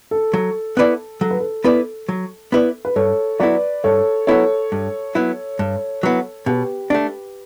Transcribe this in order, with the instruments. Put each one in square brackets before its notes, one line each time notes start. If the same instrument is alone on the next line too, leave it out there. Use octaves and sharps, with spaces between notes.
[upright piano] A4
[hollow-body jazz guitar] F#3
B3 E4 B4 D5
[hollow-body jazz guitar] F#3 [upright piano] A4
[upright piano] B4
A4
[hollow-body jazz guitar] B3 E4 B4 D5
F#3
B3 E4 B4 D5
[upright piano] B4
[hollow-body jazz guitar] G2 [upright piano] A4 C#5
[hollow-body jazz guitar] F#3 B3 E4 [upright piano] B4 D5
[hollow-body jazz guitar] G2 [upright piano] A4 C#5
[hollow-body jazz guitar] F#3 B3 E4 [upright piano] A4 C#5
[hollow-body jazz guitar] G2
F#3 B3 E4
G2
F#3 B3 E4
[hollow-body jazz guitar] B2 [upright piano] G4 B4
[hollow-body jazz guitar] A3 D4